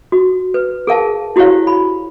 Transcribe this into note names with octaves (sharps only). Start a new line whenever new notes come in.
F#4
B4
G#4 A#4 F5 A5
E4 F#4 G4 C5 C#5 F5
B5